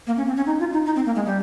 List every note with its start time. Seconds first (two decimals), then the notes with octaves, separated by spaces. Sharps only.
0.07 A#3
0.17 C#4
0.27 C4
0.37 C#4
0.46 D#4
0.60 F4
0.73 D#4
0.86 D#4
0.96 C4
1.06 A#3
1.16 G#3
1.25 G3